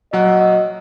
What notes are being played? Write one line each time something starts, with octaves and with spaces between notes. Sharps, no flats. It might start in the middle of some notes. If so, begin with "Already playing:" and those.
A#1 F#3 D#5 F#5